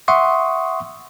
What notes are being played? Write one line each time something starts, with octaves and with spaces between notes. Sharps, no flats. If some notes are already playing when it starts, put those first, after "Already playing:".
E5 F#5 C6 C#6 D#6